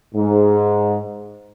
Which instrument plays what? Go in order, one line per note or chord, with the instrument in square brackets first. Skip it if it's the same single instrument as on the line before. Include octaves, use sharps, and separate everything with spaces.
[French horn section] G#2